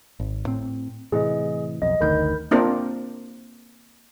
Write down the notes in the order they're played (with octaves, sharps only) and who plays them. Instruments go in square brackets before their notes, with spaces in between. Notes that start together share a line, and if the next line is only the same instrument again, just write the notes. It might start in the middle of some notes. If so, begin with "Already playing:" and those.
[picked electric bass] G#1
A2 C4
[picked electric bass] A2 C3 E3 [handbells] G#4 D#5
[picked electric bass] B1 F2 [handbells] D#5
[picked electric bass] F#1 D2 D#3 [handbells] A#4 B5 G6
[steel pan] A#3 C4 D4 F4 A#4